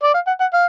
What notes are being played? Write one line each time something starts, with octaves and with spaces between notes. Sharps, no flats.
D5
F5
F#5
F#5
F5